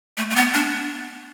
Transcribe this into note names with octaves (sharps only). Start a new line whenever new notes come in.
A3
A3
B3
D4